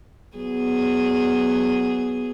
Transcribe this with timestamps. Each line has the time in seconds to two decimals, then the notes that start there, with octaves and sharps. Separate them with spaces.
0.36 F#3 B3 G#4